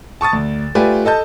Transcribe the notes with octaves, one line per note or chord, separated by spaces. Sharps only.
A5 C#6 D#6 A6
D2
A3 F4 G4 B4 D5 G#5
A4 D#5 A5 G6